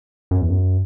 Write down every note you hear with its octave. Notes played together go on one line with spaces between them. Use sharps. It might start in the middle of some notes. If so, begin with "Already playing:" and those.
F#2
E2
F#2